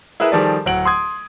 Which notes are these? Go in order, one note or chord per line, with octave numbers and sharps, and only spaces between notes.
E4 G#4 A#4 B4 E5
D#3 F3 G3 G#4 A4 D5
D1 F#3 F#5 D7 F#7
C6 D#6 G#6